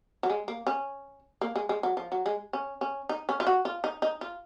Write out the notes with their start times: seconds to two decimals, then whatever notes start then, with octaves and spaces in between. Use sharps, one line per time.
0.23 F#3
0.30 G#3
0.48 A#3
0.67 C#4
1.41 A#3
1.56 G#3
1.69 G#3
1.83 F#3
1.97 F3
2.12 F#3
2.26 G#3
2.53 C#4
2.81 C#4
3.09 D#4
3.29 C#4
3.40 F4
3.47 F#4
3.65 F4
3.84 D#4
4.02 D#4
4.21 F4